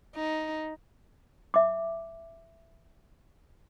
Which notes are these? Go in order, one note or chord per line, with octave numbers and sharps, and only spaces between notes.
D#4
E5 D6